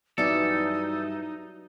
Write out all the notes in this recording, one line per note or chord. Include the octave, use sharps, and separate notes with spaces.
G2 E3 F#3 B3 D#4 E4 A4 D5